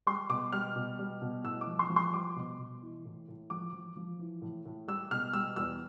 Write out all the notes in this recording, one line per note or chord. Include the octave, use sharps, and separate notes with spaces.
G3 C6
B2 D6
G3 F6
B2
G3
B2
A2 E6
D6
F3
C6
F3
C6
G3 D6
B2
B2
E3
A2
A2
F3 D6
F3
F3
E3
A2
A2
G3 E6
B2 F6
G3 E6
E2 E6